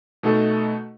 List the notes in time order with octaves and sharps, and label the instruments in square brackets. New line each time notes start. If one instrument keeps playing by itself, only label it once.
[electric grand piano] B2 A3 D#4 F#4 A4